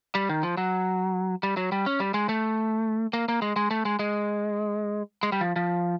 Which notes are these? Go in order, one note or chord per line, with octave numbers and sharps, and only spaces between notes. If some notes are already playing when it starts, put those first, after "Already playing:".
G3
D#3
F3
F#3
G3
F#3
G3
C#4
G3
G#3
A3
A#3
A#3
G#3
G#3
A3
G#3
G#3
G#3
G3
F3
F3